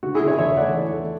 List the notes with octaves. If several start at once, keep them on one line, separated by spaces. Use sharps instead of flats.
D3 F#4
E4 G#4
D3
C#5 E5
E2 C#5 E5
A3 D5 F#5
E2
A3